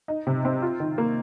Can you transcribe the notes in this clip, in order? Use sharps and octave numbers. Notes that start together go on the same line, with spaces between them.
D#4
C3
C4
F4
D#3
A#3